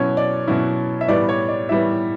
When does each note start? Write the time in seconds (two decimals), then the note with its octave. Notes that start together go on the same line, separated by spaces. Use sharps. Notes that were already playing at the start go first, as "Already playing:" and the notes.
Already playing: B2 F#3 C#4 E4 C#5
0.17 D5
0.48 B2 F#3 C#4 E4
1.01 E5
1.08 A2 E3 G3 B3 D5
1.29 C#5
1.48 D5
1.69 A2 E3 G3 B3 E5